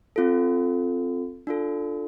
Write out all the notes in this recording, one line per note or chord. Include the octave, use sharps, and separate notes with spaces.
C4 F4 A4
D4 F4 A4